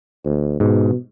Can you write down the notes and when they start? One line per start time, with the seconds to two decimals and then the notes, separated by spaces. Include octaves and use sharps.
0.25 D2
0.60 G#2 B2